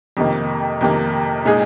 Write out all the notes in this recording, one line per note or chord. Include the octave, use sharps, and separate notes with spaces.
F2 C3 D#3 A#3
F2 C3 D#3 A#3
A#2 G#3 D#4 G#4